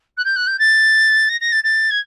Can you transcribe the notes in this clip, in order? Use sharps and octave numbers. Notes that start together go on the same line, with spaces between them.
F#6
G6
F#6
G6
A6
A#6
A#6
A6
A6
G#6